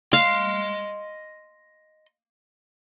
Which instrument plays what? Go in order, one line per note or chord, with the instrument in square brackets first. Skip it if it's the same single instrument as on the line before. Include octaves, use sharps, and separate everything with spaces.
[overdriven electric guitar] D#5 C6 [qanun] F5